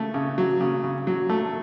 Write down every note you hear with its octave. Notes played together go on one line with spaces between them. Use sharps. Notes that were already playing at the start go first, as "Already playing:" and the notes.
Already playing: C#3 A3
C#3
F#3
C#3
C#3
F#3
A3